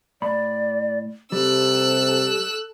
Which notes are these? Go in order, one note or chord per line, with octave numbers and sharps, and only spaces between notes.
A2 D5 B5
C3 G3 C4 A4 E6 F#6